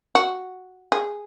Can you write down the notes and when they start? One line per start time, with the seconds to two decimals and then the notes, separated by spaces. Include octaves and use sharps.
0.15 F#4
0.92 G#4